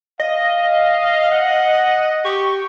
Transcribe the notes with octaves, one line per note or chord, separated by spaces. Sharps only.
D#5 F5
F#5
G4 C#6